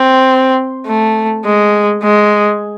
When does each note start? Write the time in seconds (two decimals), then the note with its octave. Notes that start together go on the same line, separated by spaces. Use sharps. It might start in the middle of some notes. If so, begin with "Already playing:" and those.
Already playing: C4
0.87 A3
1.45 G#3
2.03 G#3